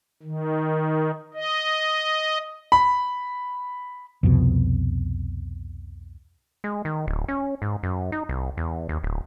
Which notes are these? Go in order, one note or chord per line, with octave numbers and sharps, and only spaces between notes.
D#3
D#5
B5
C2 F2 B2
G#3
D#3
D1
C#4
G#2
F#2
D#4
C2
E2
D#2
D1